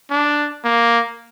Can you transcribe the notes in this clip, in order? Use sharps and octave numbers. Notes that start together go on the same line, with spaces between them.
D4
A#3